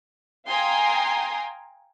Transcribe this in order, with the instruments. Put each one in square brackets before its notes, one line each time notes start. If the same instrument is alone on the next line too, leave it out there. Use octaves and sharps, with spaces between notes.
[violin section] F5 G5 G#5 A#5 C6 D#6